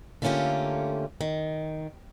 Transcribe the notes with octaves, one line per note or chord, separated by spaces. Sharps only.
D3 A3 A#3 C#4 F4 G4
D#3